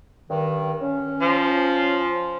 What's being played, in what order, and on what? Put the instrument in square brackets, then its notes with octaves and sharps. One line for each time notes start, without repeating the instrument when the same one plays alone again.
[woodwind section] G2 D#3
C#4
[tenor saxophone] F3